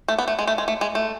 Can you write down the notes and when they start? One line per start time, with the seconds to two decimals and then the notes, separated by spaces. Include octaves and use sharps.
0.08 A3
0.18 B3
0.28 A3
0.39 G#3
0.47 A3
0.58 G#3
0.68 A3
0.81 G#3
0.95 A3